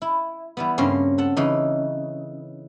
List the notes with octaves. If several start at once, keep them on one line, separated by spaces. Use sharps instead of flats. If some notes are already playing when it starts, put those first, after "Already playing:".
E4
E3 G3 B3
G2 C#3 A#3 C4 C#4
A4 F#5 A5
C#3 E3 D#4